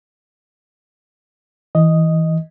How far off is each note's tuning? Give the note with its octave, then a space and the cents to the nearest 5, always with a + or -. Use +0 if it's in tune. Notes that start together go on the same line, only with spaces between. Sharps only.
E3 -20 D#5 +0